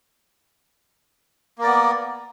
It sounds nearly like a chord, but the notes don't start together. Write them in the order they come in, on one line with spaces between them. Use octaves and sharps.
A#3 A#4 D5 B3